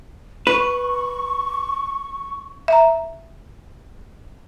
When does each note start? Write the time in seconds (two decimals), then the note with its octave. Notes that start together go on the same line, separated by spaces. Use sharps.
0.47 B4 C#6
2.68 E5 A#5